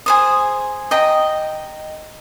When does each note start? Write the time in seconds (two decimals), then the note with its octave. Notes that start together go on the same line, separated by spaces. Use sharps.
0.06 G#4 C5 D#6
0.91 D#5 G5 A#5